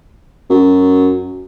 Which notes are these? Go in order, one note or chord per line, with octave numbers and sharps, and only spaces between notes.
F#2